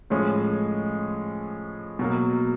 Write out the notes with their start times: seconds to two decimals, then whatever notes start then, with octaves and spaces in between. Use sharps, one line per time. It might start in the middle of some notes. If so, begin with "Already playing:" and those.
0.10 A2 F3 G#3 C#4
1.99 B2 F#3 A#3